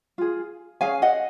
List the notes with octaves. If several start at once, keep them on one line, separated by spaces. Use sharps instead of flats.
F4 G#4
C#4 G#4 F5 G#5
D#5 F#5